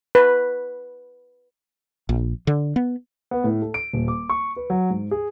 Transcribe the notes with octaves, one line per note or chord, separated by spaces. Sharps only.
B4
A#1
D3
B3
B3
A2
A4
D7
D#1
D6
C#6
B4
F#3
G#2
G#4